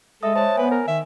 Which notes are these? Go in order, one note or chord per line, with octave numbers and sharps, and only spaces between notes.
G#3 A4 E5 D#6
C5 C#5 A5
B3 B4 G#5
A#4
D#3 E5